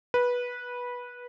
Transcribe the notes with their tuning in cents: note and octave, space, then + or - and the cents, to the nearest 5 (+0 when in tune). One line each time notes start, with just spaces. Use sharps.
B4 -15